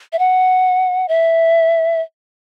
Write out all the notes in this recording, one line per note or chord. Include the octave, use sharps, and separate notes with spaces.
E5
F#5
E5